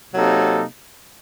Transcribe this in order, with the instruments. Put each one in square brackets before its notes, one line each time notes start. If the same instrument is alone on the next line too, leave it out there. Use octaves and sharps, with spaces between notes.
[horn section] C3 F#3 A#3 D#4 A4